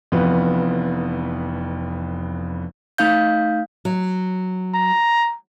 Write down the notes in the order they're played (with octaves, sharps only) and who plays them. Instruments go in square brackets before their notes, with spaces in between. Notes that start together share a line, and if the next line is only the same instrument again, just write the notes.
[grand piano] F1 F2 E3 B3 F4 B4
[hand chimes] A3 D#4 F5 G6
[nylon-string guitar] F#3
[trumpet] A#5